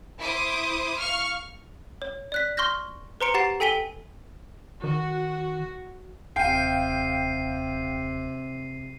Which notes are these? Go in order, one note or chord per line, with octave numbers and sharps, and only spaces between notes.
E4 C5 D6 D#6
F5 C#6 F6
C#5
D5 F#6 B6
C6 C#6 F6 G6 A#6
B4 C5 A#5 C6 C#7 D7
G4 F#5 A#5 A6 C7
A4 G5 G#5 B6 D#7 G7
D#3 F#4
D#1 C3 F5 G5 C7 D#7